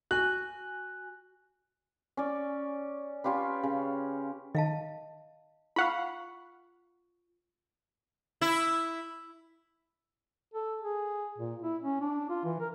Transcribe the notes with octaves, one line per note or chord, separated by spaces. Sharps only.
F#4 G#5 F#6
C#4 D5
C#4 F4 G4 B4
C#3
D#3 D#5 F5 A5
F4 F5 F#5 B5 C#6
E4
A4
G#4
A#2
E4
C#4
D4
F4
E3
A#4